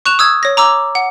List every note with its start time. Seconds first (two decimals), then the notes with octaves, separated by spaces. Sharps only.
0.06 C#6 F#6 E7 F7
0.19 D#6 E6 G#6
0.43 C#5 A#6
0.57 A#5 D6 E6
0.95 F#5